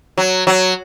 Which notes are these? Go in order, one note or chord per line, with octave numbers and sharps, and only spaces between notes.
F#3
F#3